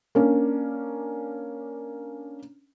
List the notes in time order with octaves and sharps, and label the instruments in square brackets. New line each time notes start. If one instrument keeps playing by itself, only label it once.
[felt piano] A#3 C#4 D4